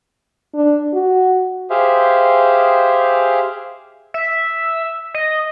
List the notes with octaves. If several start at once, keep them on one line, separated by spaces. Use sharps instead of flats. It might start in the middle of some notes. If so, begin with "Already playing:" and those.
D4
F#4
G4 G#4 C5 E5 F5
E5
D#5